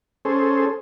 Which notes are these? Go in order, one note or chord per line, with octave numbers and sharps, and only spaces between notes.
C#4 G#4 A4 C5